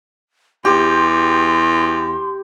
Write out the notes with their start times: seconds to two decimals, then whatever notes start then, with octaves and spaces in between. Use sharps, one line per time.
0.65 E2 G4 C6